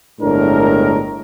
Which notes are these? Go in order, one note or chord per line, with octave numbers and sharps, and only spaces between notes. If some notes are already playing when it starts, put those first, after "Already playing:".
G1 A2 G#3 D4 A#4